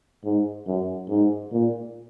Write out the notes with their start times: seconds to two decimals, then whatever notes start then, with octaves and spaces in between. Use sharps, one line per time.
0.25 G#2
0.67 F#2
1.10 G#2
1.52 A#2